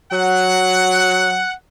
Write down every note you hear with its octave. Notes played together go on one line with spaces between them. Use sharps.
F#3 F#5